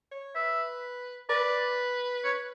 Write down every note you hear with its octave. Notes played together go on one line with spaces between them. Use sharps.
C#5
B4 E5
B4 D5
C#5